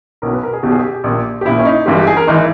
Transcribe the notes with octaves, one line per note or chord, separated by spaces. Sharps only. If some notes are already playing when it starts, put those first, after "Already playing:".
B1 B2 A#4
B4
A#4
G#4
B1 B2 G4
G#4
G4
A#1 A#2
G4
A#1 A#2 E4
C#4
D#4
G#1 G2 E3 G4
G4
G#4
A#4
G#1 E3 D#4